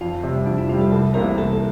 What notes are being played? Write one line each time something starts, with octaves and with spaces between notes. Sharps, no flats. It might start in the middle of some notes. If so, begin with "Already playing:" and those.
F2 F4
C3 G3
F2 D4
E4
C3 G3 F4
A4
C2 A4
C3 E3 A#3 A#4
C2 A4
A4